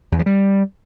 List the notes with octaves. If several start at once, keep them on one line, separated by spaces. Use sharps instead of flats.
E2
F3
G3